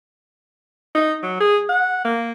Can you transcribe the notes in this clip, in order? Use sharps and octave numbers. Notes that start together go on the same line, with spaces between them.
D#4
F#3
G#4
F#5
A#3